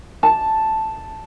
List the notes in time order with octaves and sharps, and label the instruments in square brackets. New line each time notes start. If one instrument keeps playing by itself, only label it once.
[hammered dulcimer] A5